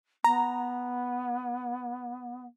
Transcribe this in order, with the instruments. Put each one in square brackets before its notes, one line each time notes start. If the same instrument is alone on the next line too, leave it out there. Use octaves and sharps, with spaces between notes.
[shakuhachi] B3 [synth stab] A#5